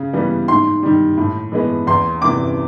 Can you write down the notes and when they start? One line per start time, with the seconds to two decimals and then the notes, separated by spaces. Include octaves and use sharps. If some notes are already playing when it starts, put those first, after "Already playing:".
Already playing: C#3
0.13 E3 G3 B3
0.48 G#2 C6
0.83 D#3 G3
1.17 A2
1.52 E3 G#3 B3
1.87 E2 C6
2.22 C3 E3 D6